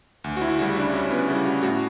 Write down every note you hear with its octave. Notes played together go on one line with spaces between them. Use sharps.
D2
F#4
E4
C#3 G3 F#4
D4
D2 C#4
B3
C#3 G3 E4
F#4
A2 F#4